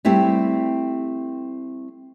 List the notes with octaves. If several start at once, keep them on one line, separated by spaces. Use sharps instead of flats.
G3 A3 C4 E4 G4